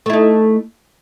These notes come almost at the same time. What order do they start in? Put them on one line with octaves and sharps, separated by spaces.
A3 E4 D#4